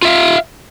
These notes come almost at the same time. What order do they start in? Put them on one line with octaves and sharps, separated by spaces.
F4 E5 F5